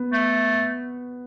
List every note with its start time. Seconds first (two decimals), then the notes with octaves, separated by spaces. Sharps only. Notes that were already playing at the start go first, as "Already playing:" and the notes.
Already playing: B3
0.13 A3